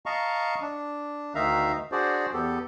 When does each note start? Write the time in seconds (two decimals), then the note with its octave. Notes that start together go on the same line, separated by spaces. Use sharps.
0.06 D#5 F5 A5 A#5 C#6
0.62 D4
1.35 D2 D#3 D#4 E5 F5 A#5
1.92 D4 F#4 G#4 C5 D5
2.33 E2 B3 G4 A4